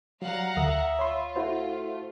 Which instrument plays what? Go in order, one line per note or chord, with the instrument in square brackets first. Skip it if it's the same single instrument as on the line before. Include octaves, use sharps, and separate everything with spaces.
[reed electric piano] F#3 [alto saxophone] G3 [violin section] F5 F#5 A#5
[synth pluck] D2 [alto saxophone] E5 [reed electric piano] D#6
[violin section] F4 [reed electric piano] C#5 B5 C6
[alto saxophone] A3 [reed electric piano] E4 F#4 C5